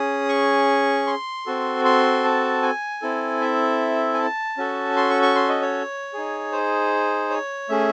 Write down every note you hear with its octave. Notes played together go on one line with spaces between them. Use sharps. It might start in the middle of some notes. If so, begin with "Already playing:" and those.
Already playing: C#4 G#4 D#6
C#6
C6
C4 F#4 A4
C6
A5
G#5
C4 E4 A4
E5
G#5
A5
C#4 F#4 A4
C6
C#6
C#6
C6
D#5
C#5
D#4 G#4
C5
C#5
A3 C#4 G#4 E5